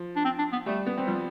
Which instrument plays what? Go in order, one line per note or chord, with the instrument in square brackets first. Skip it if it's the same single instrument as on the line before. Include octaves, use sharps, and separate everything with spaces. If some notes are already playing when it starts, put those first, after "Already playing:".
Already playing: [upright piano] F3
[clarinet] D4
C4
D4
B3
[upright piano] G3 [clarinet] A3
[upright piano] B3
C4
[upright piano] F3 [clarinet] G3